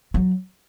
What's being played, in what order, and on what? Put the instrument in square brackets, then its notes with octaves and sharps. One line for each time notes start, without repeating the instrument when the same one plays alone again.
[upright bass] F#3